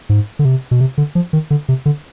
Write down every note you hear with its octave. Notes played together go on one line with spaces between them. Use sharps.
G#2
D3
C3
B2
C3
D3
F3
D#3
D3
C3
D3